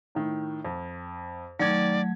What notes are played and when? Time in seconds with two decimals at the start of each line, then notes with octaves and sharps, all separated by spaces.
0.15 A2 D#3
0.65 F2
1.59 D#3 F#3 A3 D5 G#6